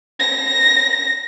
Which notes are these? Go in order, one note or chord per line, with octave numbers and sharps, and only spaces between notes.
A#6